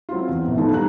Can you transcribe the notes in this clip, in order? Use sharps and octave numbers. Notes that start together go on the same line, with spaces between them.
F#3 C4 E4 F4
E2
A#1 B3
D#3 F3 A3 B3 D#4 E4
G#2 G3 A#5 F#6